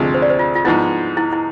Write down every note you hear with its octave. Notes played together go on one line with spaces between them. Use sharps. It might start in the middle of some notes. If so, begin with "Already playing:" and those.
Already playing: D2 C3 F3 G#3
C5
D5
C5
F4
F4
G#2 F3 B3 E4
E4
E4